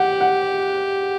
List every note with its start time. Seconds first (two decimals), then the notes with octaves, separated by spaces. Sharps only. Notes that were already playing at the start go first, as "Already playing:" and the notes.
Already playing: G4 F#5
0.21 F#5